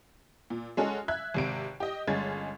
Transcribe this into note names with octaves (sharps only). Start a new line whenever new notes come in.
A#2
G#3 C#4 F#4 A4
E5 F#6 G#6
G#1 C3 D7
G4 D#5
G1 G#3 C#4 G#6 A6